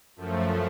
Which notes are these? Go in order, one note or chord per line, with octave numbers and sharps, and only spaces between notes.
F#2 F3 A3